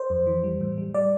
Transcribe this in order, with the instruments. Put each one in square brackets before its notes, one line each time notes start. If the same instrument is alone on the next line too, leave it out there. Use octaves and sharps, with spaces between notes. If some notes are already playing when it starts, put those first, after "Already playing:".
Already playing: [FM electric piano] C5
F2
E3
G3
A2
G3
G3 D5